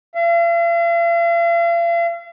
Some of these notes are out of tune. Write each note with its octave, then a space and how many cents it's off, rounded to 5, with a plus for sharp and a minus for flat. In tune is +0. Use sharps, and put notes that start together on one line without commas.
F5 -45